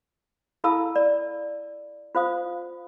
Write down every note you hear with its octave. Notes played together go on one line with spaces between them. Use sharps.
E4 A4 F5 A5 B5 E6
D5
F4 C5 F5 D#6